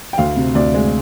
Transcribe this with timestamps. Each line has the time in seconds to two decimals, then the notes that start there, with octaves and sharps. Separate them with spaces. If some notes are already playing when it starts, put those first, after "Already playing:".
0.13 G5
0.18 D2 F5
0.36 C3
0.55 D2 D5
0.74 G#3